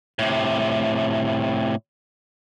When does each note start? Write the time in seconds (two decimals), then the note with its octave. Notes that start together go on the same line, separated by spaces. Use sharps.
0.19 A2 C3